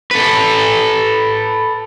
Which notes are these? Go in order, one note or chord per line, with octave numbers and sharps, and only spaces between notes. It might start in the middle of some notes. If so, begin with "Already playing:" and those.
A4 B4